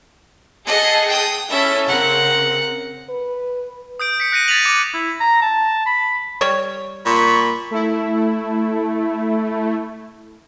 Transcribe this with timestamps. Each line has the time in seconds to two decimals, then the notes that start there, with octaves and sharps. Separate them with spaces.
0.67 G#4 A4 D#5 F#5
1.07 G5 D#6
1.50 C#4 E4 A4 E5
1.87 C#3 C4 A#4 F#5
3.10 B4
4.00 D#6 G6 D7
4.20 B6 C#7
4.32 F#6 A#6 C#7 D#7
4.48 A6 B6 D7 D#7 F7 F#7
4.65 D6
4.94 E4
5.20 A#5
5.42 A5
5.86 B5
6.41 G3 C#5
7.06 A#2 B5 C#6
7.71 A3 E4